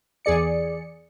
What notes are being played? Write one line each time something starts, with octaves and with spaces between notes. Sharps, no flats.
E2 G#4 D5 C#7